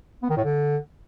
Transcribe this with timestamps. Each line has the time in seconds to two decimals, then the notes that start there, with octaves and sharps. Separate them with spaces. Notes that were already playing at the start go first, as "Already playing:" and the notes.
0.23 B3
0.30 D#3
0.37 A2
0.44 D3